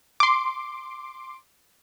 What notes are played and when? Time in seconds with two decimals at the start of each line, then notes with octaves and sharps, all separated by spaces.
0.20 C6 D6